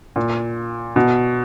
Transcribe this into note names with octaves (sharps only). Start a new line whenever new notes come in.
A#2
B2